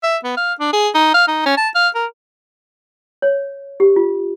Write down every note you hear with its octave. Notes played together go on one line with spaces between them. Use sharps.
E5
B3
F5
D4
G#4
D#4
F5
D#4
C#4
A5
F5
A#4
C#5
G4
F4